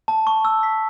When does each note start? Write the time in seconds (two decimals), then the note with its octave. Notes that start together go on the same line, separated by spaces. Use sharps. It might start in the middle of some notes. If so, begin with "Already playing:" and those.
0.08 A5
0.27 C#6
0.45 E6
0.63 B6